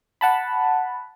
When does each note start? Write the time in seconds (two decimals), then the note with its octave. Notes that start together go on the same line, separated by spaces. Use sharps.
0.21 F#5 A5 B5